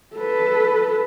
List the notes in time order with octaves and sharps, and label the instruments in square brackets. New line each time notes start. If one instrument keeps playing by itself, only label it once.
[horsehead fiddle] A4 B4